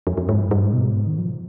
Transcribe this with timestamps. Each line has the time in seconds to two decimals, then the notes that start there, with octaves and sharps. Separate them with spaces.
0.07 F2
0.18 F2
0.29 G#2
0.39 G2
0.51 G2
0.63 G#2
0.73 B2
0.90 G#2
1.07 D#3
1.18 F3